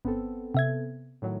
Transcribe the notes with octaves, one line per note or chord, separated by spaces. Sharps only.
G1 B3 C4 A4
C3 E5 G#6
A2 D#3 F#3